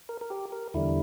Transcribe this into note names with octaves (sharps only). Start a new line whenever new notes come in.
A#4
A#4
G4
A#4
E2 D3 G3 E4